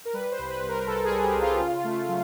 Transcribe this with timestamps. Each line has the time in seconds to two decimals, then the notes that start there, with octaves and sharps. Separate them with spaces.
0.05 A#4
0.13 G3 B4
0.31 C5
0.39 C2
0.50 B4
0.62 C2
0.69 A#4
0.87 C2 A4
1.05 G#4
1.11 G3
1.24 G4
1.36 C2
1.41 F4
1.60 C#3
1.84 A3
2.09 F#3